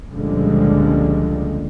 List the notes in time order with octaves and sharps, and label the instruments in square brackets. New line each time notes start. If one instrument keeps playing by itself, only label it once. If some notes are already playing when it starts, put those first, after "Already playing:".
[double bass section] C#2 A#2 D3 F3 G3 G#3